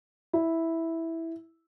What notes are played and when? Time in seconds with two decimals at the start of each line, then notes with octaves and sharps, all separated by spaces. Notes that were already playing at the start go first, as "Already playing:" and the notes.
0.33 E4